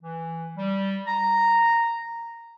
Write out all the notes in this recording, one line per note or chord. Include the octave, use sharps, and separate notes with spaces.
E3
G3
A#5